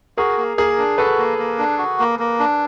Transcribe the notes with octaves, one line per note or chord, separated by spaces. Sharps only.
F#4 G#4 A#4
A#3
A#3 G#4 A#4
D4
F#4 A4 B4
A#3
A#3
D4
F#4
A#3
A#3
D4